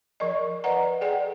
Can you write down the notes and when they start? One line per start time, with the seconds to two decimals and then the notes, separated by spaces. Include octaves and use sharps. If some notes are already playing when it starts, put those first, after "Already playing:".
0.20 F3 A#4 D5 D#5
0.64 B4 D5 D#5 F#5 A#5
1.01 G#4 A4 D5 F#5 G5